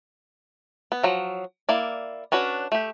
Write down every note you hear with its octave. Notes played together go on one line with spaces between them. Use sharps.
B3
F3 F#3
A#3 E4 D5
C#4 D4 F#4 B4
A3 G4